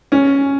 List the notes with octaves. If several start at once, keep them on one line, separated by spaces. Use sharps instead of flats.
C#4